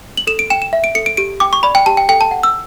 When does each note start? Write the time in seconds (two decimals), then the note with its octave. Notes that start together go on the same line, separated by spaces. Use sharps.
0.17 F#7
0.27 A4 E7
0.39 D7
0.50 G5 E7
0.62 E7
0.73 E5
0.84 D7
0.95 A4 C#7
1.06 D7
1.17 G4 D7
1.40 G5 D6
1.53 C#6
1.63 D5 B5
1.75 G5
1.86 G4 A5
1.97 G5
2.09 A4 G5
2.21 A5
2.31 F#5
2.43 E6